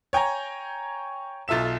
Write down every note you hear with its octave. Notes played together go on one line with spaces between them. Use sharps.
C#5 G5 G#5 A#5
B1 F4 A4 E5 E7